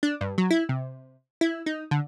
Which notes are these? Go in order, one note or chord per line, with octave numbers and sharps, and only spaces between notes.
D4
G2
F#3
E4
C3
E4
D#4
D3